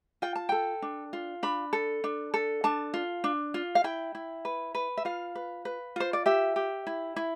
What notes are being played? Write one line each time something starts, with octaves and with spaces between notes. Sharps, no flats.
F4 G5
A5
A4 G5
D4
F4
D4 B5
A4
D4
A4
D4 A5
F4
D4
F4
F5
E4 G5
E4
B4
B4
E5
F4 F5
B4
B4
F4 C5
D5
G4 E5
G4
E4
E4